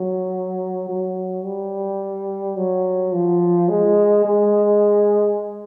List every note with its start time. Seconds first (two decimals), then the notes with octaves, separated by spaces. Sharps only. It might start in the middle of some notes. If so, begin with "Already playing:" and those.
Already playing: F#3
0.89 F#3
1.44 G3
2.57 F#3
3.12 F3
3.69 G#3
4.24 G#3